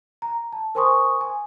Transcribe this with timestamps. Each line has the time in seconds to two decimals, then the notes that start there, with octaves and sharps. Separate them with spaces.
0.22 A#5
0.52 A5
0.75 A#4 C5 G#5 C6 C#6 D#6
1.21 G#5